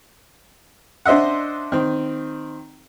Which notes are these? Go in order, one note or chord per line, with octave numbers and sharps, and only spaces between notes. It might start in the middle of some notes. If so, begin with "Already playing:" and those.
D4 C5 D#5 E5 F#5
D#3 C4